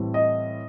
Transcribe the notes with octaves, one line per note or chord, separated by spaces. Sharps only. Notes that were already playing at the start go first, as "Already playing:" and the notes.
Already playing: A2 E3 G3 C4
D#5